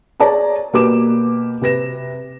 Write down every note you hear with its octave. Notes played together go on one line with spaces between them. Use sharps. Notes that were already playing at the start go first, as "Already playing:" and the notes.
G#4 C#5 D5 A5 A#5
B2 A#3 G4 B4 D6 E7
C3 B4 A#6 E7